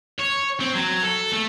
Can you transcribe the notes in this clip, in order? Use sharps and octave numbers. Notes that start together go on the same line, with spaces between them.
C#5
C4
F#3
A4
A3